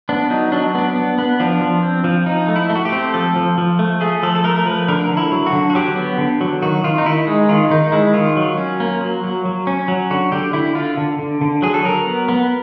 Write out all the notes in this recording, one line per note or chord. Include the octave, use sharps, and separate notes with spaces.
B3 D4
F#3 D#4
F#3 D4
B3 D4
B3
B3
F3 D4
F3
C4
F3
F3 D#4
A3
E4
A3
F#4
G4
C4
F3 A4
F3
F3
A3
A3 G#4
F3 A4
A4
A3 A#4
A#4
F3 B4
D3 A#4
D3
E4
F#3
F#4
D3
F#4
F#3 G4
B3
D3
F#3
D#3 F#4
D#3 F4
D#4
D#3 E4
G#3 D#4
D#3 F4
D#3 D#4
G#3 E4
D#3 F4
F#3
C#4
A#3
F#3
F#3
F#3
C#4
F#3
D3 F#4
D3 G4
D3 E4
D3 F4
D3
D3
D3
F#3 G#4
A4
F#3 A#4
B3
B3